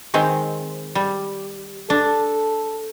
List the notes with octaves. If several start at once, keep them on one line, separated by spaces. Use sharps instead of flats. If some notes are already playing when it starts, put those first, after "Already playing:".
D#3 G#3 C4
G3
D4 A4